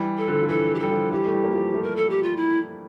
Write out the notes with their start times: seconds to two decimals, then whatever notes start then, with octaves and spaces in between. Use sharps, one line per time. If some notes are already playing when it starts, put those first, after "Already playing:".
Already playing: E3 G3
0.18 A4
0.28 D3 F3
0.42 F3
0.48 E3 A4
0.75 G4
0.79 G3 A4
0.90 D3 F3
1.11 E3 G3 G4
1.26 A3
1.32 E3 G3
1.44 A#3
1.53 F3 A3
1.74 F3 A3
1.83 A#4
1.96 A4
2.10 G4
2.23 F4
2.37 E4